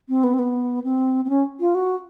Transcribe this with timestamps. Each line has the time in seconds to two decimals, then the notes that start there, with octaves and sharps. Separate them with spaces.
0.09 C4
0.24 B3
0.34 C4
0.39 B3
0.84 C4
1.25 C4
1.29 C#4
1.60 F4
1.75 F#4